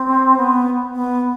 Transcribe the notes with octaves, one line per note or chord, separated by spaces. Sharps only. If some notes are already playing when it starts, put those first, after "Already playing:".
Already playing: C4
B3
B3